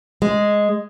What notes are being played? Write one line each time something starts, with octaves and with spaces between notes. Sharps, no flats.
G#3